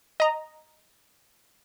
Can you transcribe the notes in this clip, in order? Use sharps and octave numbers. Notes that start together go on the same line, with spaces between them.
D#5 A#5